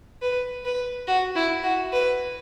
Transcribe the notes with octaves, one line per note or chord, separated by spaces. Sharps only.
B4
B4
F#4
E4
F#4
B4